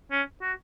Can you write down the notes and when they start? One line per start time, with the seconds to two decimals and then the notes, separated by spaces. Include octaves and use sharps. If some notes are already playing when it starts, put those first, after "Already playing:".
0.11 C#4
0.42 F#4